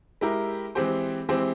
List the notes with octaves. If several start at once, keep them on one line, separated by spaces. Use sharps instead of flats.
G#3 E4 G4 A#4
E3 G#3 C4 G4 C5
E3 G#3 C4 G4 C5